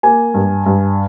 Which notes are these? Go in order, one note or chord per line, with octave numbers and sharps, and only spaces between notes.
A#3 G#5
G2
G2